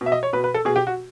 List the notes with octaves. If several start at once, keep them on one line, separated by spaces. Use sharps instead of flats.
B2
E5
D#5
C#5
B2 B4
B4
A4
B2 G#4
G4
F#4